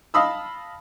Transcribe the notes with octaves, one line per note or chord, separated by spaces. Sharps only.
D#5 F5 A5 B5 D#6 E6